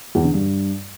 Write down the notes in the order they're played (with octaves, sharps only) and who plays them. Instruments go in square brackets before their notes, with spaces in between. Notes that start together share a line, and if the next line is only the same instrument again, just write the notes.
[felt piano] E2
D3
G2